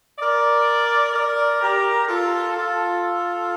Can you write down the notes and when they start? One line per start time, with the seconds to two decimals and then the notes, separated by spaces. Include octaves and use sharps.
0.19 A#4 D5
1.13 A#4 D5
1.61 G4 A#4
2.08 F4 A4
2.56 F4 A4